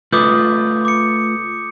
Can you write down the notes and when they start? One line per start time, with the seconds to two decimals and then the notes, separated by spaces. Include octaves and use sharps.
0.12 A3 F4 B4 D6 D#6 G6
0.85 D6 C#7